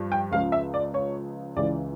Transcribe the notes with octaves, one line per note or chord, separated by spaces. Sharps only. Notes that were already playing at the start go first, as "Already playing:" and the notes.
Already playing: G2 F3
G5
C#2 C#3 F3 F5
E5
D5
C#5
C#2 C#3 E3 D5